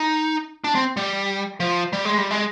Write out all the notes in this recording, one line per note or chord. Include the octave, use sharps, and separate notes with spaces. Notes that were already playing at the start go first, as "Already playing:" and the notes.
Already playing: D#4
D4
C4
G3
F3
G3
G#3
G3
G#3